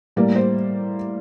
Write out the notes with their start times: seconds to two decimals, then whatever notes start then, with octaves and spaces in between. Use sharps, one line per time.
0.16 A2 G3 A#3 D5
0.35 C5